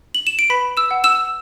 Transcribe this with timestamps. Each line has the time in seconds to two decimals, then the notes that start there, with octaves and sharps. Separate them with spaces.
0.15 F#7
0.27 E7
0.39 D7
0.50 B4 B5 B6
0.77 E6 E7
0.91 F#5
1.04 E6 E7